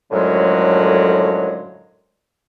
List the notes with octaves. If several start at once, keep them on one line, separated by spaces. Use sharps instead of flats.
F#2 A2 D3 F3 F#3 G#3